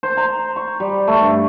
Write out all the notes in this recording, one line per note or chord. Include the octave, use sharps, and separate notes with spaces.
C5
A#5
C#6
G3
A3
G2